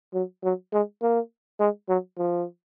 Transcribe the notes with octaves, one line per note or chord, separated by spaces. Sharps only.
F#3
F#3
G#3
A#3
G#3
F#3
F3